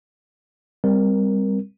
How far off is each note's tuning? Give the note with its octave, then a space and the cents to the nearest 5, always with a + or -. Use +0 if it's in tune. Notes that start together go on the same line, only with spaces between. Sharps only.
G3 +25 C4 +0 A#4 +10